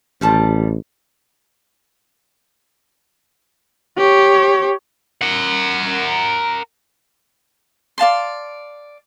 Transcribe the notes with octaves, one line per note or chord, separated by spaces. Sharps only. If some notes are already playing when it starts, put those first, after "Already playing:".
A1 D#3 G3 A5
G4 C#5
A#4 F#5
D5 F5 A5 C6